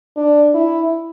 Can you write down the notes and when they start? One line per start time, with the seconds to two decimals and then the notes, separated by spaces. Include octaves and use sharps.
0.17 D4
0.54 E4